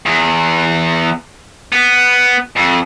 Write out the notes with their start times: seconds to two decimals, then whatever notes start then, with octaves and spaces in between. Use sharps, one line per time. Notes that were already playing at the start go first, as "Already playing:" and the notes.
0.06 E2
1.72 B3
2.57 F2